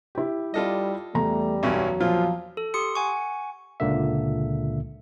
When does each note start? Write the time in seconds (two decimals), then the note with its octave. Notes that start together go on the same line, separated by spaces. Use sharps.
0.15 E4 G4
0.54 G3 F4 A4 D#5
1.15 E2 G3 A3 A#5
1.63 B1 F#2 F#3 C#4
2.00 A#2 F3 F4
2.57 A4
2.74 G4 C6 D#6 C#7
2.95 F#5 G#5 C#6
3.80 C#2 A#2 D3 A#3 E5